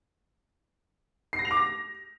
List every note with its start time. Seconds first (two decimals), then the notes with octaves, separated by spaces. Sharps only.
1.33 C7
1.39 A#6
1.45 F7
1.51 D6
1.57 A#6